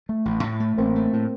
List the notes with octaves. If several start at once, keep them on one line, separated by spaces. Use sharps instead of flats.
A3
A1
A2
A3
A1 A#3 C4
A3
A2